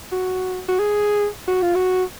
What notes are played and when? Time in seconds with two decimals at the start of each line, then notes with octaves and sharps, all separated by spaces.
0.12 F#4
0.69 F#4
0.79 G#4
1.48 F#4
1.62 F4
1.75 F#4